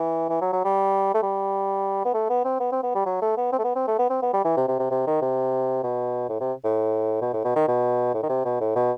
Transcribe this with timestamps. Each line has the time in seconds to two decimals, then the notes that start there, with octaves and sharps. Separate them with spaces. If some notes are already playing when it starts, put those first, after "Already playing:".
Already playing: E3
0.29 E3
0.41 F#3
0.53 F#3
0.64 G3
1.14 A3
1.22 G3
2.05 B3
2.14 A3
2.30 B3
2.45 C4
2.60 B3
2.72 C4
2.83 B3
2.95 G3
3.06 F#3
3.22 A3
3.37 B3
3.52 C4
3.59 A3
3.64 B3
3.76 C4
3.88 A3
3.99 B3
4.10 C4
4.22 B3
4.33 G3
4.44 E3
4.57 C3
4.68 C3
4.79 C3
4.91 C3
5.07 D#3
5.22 C3
5.83 B2
6.29 A2
6.40 C3
6.64 A2
7.21 B2
7.33 A2
7.45 B2
7.56 D#3
7.68 B2
8.14 A2
8.23 D#3
8.29 C3
8.45 B2
8.60 A2
8.76 B2